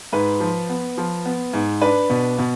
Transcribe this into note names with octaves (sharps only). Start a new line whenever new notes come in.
G#2 B4
F3
B3
F3
B3
G#2
D4 B4
B2
B2